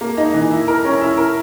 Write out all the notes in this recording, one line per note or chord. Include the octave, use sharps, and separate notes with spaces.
A#3
D#4
E3
E4
A#4
C#4
E4
A#4